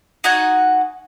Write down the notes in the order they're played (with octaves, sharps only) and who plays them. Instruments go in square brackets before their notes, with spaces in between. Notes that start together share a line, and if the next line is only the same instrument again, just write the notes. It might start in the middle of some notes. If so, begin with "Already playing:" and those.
[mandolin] D#4 F#4 F#5 G#5